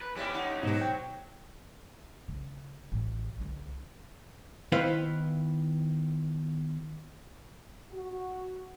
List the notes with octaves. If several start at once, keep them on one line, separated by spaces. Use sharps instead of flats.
B4
G3 B3 C#4 E4 G4
D#4 F#5
G#2 B2 F#3 D#4 F#4 G4 C5
G5
C#3
A1
C#2 D3
D#3 B3 E4 B4 C5 F5
F#4